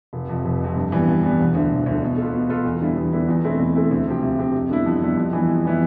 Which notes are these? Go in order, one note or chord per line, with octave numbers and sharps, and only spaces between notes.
F1
F2 C3
F1
F2 C3
G2
E3 G3 B3
G2
E3 G3 B3
E1
D2 D3
E1
D2 D3
B2
B3 F4 A4
B2
B3 F4 A4
E2
D3 G3 B3 E4
E2
D3 G3 B3 E4
E2
B2 A3 C4 E4
E2
B2 A3 C4 E4
D2
C3 F3 C4 G4
D2
C3 F3 C4 G4
F2
D3 G3 B3 E4
F2
D3 G3 B3 E4
F2
E3 G3 B3 E4
F2
E3 G3 B3 E4